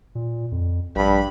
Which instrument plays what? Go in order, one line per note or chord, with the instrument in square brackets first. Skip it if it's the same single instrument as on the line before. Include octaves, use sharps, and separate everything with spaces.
[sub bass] A#2
F2
[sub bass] A#1 [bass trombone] G2 [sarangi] B5